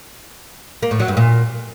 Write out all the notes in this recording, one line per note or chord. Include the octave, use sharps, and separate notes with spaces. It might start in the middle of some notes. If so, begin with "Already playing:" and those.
A#3
A2
F#3
G2
A#2